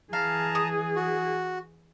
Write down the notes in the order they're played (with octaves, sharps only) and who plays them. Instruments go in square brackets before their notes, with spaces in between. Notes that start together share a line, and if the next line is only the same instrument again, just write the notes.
[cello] E3 G#4 [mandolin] F5 [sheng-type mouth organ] A5 A#5
[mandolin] D#6
[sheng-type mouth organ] F#4